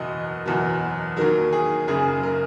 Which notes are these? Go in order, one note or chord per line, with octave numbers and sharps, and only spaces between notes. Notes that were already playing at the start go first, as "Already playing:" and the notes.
Already playing: F#1 E2 B2 D#5
F#1 E2 B2 F#3
D#2 D#3 F#3 A#4
G#4
F#1 F#2 C#3 G#4
A#4